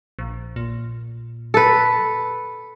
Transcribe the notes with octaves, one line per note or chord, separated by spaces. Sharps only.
A#1
A#2
A4 B4